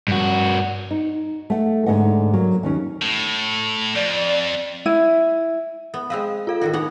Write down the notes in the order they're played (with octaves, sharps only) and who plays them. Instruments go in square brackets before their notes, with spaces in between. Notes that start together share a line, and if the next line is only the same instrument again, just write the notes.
[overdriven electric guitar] G2 F#4
[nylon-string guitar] D#4
A3 F#5
G#2 D3 A3 D#5 F#5
F#3 A#3
D#2 D#3 C#4
[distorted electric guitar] A2
[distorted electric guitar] F2 [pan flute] D5
[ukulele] E4
[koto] B3
[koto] G#3 C4 B4 [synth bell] F5
[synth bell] F4 A4 F5
[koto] A2 D#3 F#4
[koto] B3 F#5 [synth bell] D#4